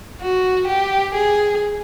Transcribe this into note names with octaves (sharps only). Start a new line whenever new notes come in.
F#4
G4
G#4